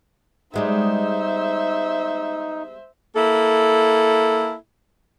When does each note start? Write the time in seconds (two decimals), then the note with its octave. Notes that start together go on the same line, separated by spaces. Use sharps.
0.54 G3 G#3 B3 D#4 C5 E5
3.15 A#3 E4 A4